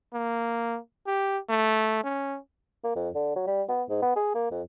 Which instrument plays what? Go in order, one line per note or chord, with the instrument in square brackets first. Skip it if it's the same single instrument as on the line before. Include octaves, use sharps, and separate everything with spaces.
[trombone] A#3
G4
A3
C#4
[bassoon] A#3
F2
D3
F#3
G3
B3
G#2
B3
G#4
A#3
F2